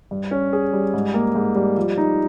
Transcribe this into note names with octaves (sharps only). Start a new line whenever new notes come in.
G2
C#4
G#4
G3
G#2
A#3
G#2
G3
F3
D#4